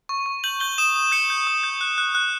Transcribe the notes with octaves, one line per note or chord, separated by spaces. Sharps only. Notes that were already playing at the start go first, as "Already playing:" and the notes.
C#6
C#6
G6 F#7
G6 G7
D#6 E7
D#6
G6 C#7
G6
D#6
G6
F#6
F#6
F#6